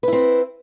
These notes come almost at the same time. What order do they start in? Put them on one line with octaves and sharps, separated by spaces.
B4 E4 C4